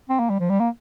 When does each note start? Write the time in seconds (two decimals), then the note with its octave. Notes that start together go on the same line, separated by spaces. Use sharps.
0.10 C4
0.19 A#3
0.30 G3
0.40 F3
0.50 G3
0.60 A#3